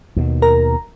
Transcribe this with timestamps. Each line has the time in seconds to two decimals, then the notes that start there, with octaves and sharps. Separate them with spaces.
0.16 D#2 B2
0.42 A#4 A#5